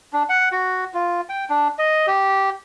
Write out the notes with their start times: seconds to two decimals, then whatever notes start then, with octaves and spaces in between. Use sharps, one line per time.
0.13 D4
0.29 F#5
0.52 F#4
0.94 F4
1.29 G5
1.50 D4
1.79 D#5
2.07 G4